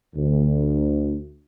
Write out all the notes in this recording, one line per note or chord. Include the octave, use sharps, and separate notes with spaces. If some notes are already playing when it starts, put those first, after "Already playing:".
D2